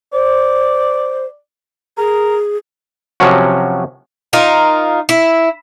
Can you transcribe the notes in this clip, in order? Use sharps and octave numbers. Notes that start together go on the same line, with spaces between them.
C5 D5
G#4 A#4
C3 F3 F#3 C#4 F#4
D#4 F4 A#4
E4